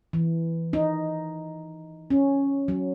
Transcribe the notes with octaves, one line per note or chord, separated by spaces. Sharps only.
E3
D#4
C#4
F#3